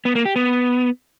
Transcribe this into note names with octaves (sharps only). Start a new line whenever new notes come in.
B3
A#3
G4
B3